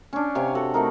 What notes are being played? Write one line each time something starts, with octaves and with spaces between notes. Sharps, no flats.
C#4 D4
C3 C#5 F5 G#5
F#4 A4 F#5
A3 C4 D#4 A#4